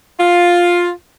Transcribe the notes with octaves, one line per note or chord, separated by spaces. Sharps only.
F4